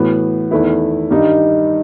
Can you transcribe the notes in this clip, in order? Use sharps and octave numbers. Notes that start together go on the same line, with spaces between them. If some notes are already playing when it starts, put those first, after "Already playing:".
Already playing: A2 E3 B3 F#4
E2 D#3 A3 E4 B4
G2 D#3 G3 D#4